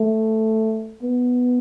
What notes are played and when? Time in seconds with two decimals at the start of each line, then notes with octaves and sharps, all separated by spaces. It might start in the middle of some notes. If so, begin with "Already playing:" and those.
Already playing: A3
1.03 B3